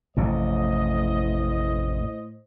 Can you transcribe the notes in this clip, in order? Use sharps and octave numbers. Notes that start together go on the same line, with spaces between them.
A1 F2 A2 C3 C5 D#5